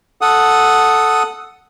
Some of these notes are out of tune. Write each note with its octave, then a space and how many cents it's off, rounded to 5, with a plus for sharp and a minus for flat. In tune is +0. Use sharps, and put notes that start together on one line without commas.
A4 +0 F#5 +0 D#6 +0